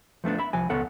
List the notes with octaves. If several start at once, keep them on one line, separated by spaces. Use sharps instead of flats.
F3 A3 B3 D4
E5 B5
C2 F3 G#5
C#2 B3 A4 C#5 F#5